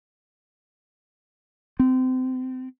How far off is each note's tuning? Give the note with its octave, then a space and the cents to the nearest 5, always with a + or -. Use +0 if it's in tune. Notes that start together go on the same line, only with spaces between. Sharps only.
C4 -30